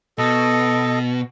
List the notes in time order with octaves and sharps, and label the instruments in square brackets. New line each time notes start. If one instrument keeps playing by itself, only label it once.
[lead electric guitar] B2 [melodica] A4 D#5